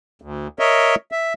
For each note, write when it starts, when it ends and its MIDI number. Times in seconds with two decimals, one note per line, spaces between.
0.22 0.47 38
0.59 0.95 70
0.59 0.95 73
0.59 0.95 75
0.59 0.95 76
1.12 1.33 76